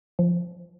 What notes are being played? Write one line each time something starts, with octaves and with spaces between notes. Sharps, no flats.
F3